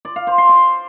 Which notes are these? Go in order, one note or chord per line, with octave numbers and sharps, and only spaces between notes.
D5
F5
C5
C6
D6